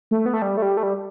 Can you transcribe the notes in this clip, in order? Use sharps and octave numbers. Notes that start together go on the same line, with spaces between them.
A3
B3
A3
G3
A3
G3
A3
G3